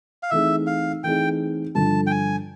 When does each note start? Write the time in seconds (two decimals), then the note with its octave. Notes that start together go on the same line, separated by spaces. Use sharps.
0.23 F5
0.30 E3 A3 C4 D#4 G#4 E5
0.67 F5
1.03 E3 A3 C4 D#4 G#4 G5
1.75 G2 D3 F3 A5
2.07 G5
2.11 G#5